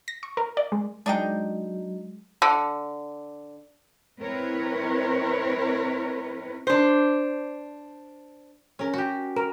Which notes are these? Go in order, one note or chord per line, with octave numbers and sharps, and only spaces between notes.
A#6
C#6
A#4
D5
G#3
F#3 G#3 D4 D#4 G5
D3
C4 E4 A#4 B4 C#5
D4 C5
C#4 A#4
F#4 G4
A#4